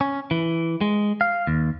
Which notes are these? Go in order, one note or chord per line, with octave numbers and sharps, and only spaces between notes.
C#4
E3
G#3
F5
D#2